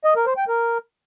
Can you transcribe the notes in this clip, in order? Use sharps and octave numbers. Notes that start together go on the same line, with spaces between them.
D#5
A#4
C5
G5
A#4